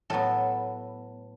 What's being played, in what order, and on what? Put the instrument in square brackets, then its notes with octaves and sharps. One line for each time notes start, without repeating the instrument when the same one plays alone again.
[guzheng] A2 F#3 B3 A4